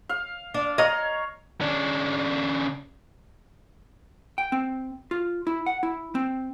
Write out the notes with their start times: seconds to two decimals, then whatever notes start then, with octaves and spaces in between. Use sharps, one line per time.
0.09 F5
0.54 D4
0.78 C#5 D#5 F5 A#5
1.61 C#3 D4
4.38 G5
4.52 C4
5.11 F4
5.47 E4
5.66 F#5
5.83 E4
6.15 C4